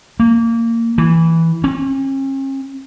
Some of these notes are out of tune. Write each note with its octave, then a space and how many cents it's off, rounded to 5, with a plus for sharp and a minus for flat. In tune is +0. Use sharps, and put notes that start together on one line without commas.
A#3 -20
E3 -5
C#4 -45